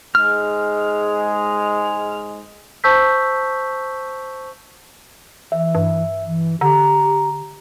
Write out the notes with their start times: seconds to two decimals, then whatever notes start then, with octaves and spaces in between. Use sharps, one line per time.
0.15 G#2 G#3 F6
2.84 C5 A5 C#6 E6 G6 B6
5.52 E3 E5
5.75 G2
6.27 E3
6.61 D3 G4 A#5